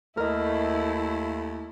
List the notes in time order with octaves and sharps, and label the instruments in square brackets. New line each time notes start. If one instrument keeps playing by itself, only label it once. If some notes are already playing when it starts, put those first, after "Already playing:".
[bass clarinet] D#2 [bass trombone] A3 [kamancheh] E4 [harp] A#4 D#5